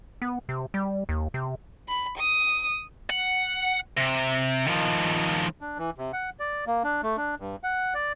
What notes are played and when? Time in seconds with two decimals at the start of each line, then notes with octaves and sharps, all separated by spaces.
0.22 B3
0.49 C3
0.74 G3
1.09 D#2
1.34 C3
1.89 B5
2.18 D#6
3.10 F#5
3.98 C3
4.68 D#3 F3
5.61 D4
5.78 E3
5.98 C3
6.13 F#5
6.40 D5
6.67 A#3
6.84 D4
7.03 A3
7.17 D4
7.40 G2
7.63 F#5
7.94 D5